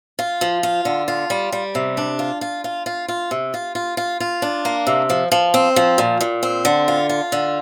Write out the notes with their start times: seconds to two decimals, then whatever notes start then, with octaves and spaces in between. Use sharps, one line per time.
0.19 F4
0.41 F3
0.63 F4
0.85 D3
1.08 F4
1.30 G3
1.52 G3
1.75 C3
1.97 D4
2.19 F4
2.41 F4
2.64 F4
2.86 F4
3.08 F4
3.31 C3
3.54 F4
3.75 F4
3.97 F4
4.20 F4
4.42 D4
4.65 A#3
4.87 C3
5.10 F3
5.32 F3
5.54 C4
5.76 F3
5.98 A#2
6.21 A#2
6.43 C4
6.65 D3
6.88 F4
7.09 F4
7.32 D3